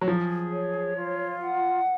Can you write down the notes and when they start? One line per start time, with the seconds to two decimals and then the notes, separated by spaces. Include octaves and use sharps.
0.01 F#3
0.07 F3 G#4
0.52 C#5
0.96 F4
1.39 F#5